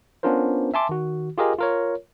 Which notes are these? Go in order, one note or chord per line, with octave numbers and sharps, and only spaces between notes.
B3 C#4 D4 F4 A#4 C5
E5 G#5 A5 C6 D6
D#3 F#4
F4 G4 G#4 A#4 D#5 G#5
F4 A#4 C#5